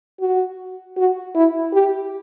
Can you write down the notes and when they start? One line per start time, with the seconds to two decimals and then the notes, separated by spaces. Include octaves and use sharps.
0.20 F#4
0.97 F#4
1.35 E4
1.73 G4